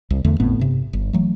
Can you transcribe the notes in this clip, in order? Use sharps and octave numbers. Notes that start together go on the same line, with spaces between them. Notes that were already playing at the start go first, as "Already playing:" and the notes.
C2
E2 D3 A3
G#1 A2 B3 C4
G2 C3
G1
E3 F#3 A3